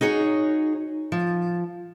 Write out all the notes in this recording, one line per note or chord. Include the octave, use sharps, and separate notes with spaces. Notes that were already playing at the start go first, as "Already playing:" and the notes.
D#4 F#4 G#4 C#5
F3